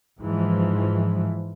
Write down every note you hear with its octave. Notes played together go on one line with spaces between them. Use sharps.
G#2 E3 F3